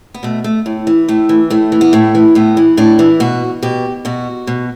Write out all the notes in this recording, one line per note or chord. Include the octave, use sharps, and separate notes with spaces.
B3
B2 A3
A3
A2
E3
A2 A3
E3
A2 A3
E3
B3
A2 A3
E3
A2 B3
E3
A2 D4
E3
B2 F#4
B2 G4
B2 F#4
B2